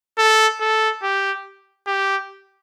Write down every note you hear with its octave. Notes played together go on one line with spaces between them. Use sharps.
A4
A4
G4
G4